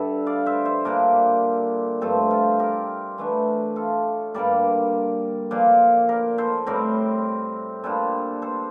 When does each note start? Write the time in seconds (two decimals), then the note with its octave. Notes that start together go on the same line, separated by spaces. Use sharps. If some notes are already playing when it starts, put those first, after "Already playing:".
Already playing: G2 D3 G3 E5
0.26 D5 F5
0.46 C5 E5
0.65 C5 E5
0.85 A#2 G3 A#3 D4 A#4 D5
2.01 G2 F3 A3 C4 A4 C5
2.31 F4 A4
2.59 G4 A#4
3.18 E3 A3 D4
3.76 F4 A4
4.34 G2 D3 G3 A#3 A#4 D5
5.51 A#2 F3 A#3 D5 F5
6.09 A#4 D5
6.38 A4 C5
6.66 A2 G3 C4 A#4 D5
7.84 A#2 G3 D4 A4 C5
8.42 A4 C5